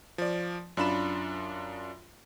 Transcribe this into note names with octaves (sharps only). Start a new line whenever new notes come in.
F3 D5
F#2 D4 F4 B5 E7